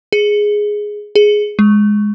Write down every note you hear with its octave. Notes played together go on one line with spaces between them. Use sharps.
G#4
G#4
G#3